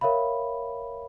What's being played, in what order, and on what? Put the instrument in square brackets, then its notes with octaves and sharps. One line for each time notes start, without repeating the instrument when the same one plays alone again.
[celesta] A#4 C#5 E5 F5 B5